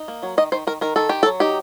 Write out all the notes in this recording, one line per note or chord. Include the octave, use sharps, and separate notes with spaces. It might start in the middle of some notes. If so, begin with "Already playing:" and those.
Already playing: D#4
A#3
F#3
D#3 D#5
D#3 C5
D#3 A#4
D#3 A#4
D#3 A4
D#3 G4
A4
F#3
D#4 G4